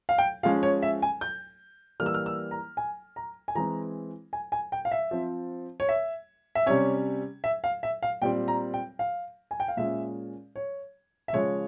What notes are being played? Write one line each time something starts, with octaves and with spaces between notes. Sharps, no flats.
F5
G5
F3 G#3 C#4 F5
C#5
E5
G#5
G6
E3 G3 A#3 F6
E6
F6
E6
A#5
G#5
A#5
G#5
E3 G#3 C4 A#5
G#5
G#5
G5
F5
E5
F3 C4
C#5
E5
E5
C3 G3 C#4 C#5
E5
F5
E5
F5
A#2 G3 C4 G5
A#5
G5
F5
G#5
G5
F5
A#2 G#3 C#4 E5
C#5
E5
C#3 F3 G#3 C#5